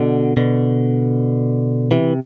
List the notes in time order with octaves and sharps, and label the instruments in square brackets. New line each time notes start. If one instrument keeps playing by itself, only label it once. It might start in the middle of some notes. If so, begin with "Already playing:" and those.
Already playing: [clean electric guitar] B2 D3
B2 D3
C3 E3